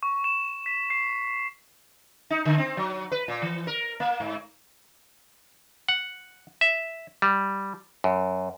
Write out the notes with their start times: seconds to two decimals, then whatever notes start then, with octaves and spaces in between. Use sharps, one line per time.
0.03 C#6
0.24 E7
0.66 B6
0.90 C7
2.30 D#4
2.45 D3
2.58 C4
2.77 F#3
3.12 B4
3.28 A#2
3.42 E3
3.67 A#4
4.00 A#3
4.20 G#2
5.89 F#5
6.61 E5
7.22 G3
8.04 F#2